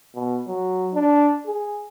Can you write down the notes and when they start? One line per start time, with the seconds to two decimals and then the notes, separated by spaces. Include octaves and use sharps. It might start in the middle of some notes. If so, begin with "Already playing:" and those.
0.15 B2
0.48 F#3
0.94 D4
1.46 G#4